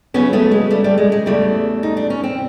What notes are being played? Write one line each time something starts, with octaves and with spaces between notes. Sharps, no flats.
F2 C#3 F#3 B3 C#4
A3 B3
G#3
G3 A3
G3 A3
G#3
G#3
E2 C#3 E3 G3 A3
D#4
D4
C#4
C4